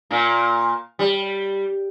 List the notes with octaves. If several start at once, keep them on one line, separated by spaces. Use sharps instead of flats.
A#2 A#3
G3